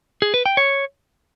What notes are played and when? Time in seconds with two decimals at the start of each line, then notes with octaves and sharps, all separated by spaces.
0.22 G#4
0.34 B4
0.46 G5
0.57 C#5